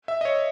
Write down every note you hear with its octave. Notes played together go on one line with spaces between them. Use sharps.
E5
D#5
C#5